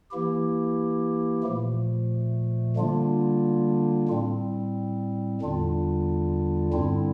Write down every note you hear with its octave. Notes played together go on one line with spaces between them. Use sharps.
E3 A#3 E4 G4
A#2 F3 A3
D3 G3 A#3 D4 F4
A2 G3 C4
E2 D3 G3 D4 F4
G2 D3 G3 C4 E4